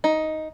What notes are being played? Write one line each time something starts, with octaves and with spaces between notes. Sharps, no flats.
D#4